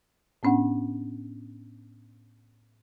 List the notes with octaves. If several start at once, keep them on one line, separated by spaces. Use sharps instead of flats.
A2 B3 C#4 D4 F#5